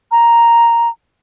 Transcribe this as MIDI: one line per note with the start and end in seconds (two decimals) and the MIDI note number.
0.11 0.88 82